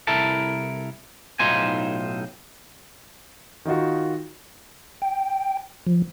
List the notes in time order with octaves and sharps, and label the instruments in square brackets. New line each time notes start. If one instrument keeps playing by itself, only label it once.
[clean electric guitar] C2 E4 A4 A#4 A5
B1 A2 D#4 F4 C5 G#5
[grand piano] D#3 D#4 F4 F#4
[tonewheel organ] G5
F3